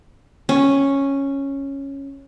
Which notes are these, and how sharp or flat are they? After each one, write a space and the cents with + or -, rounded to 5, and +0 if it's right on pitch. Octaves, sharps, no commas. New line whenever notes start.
C#4 -5